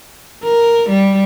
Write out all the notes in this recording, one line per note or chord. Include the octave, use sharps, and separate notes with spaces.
A#4
G3